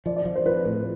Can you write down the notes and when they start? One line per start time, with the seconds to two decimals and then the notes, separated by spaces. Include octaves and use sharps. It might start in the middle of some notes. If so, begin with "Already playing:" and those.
0.06 F3 D5
0.16 D5
0.25 F3
0.36 C5
0.46 F3 B4
0.65 A2 B4